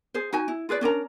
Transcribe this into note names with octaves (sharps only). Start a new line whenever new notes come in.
G#4 C5
D#4 F#4 G#5
E4
F4 G#4 B4 D5
C#4 D4 A#4 A#5